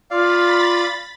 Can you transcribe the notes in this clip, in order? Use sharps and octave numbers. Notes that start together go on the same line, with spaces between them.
F4 D5 F5 B5 A6